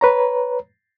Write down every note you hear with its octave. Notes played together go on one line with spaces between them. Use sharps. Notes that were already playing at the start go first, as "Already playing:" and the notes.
B4 C#5 A#5